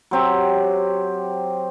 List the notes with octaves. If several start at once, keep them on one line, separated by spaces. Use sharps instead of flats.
F#3 C4 G4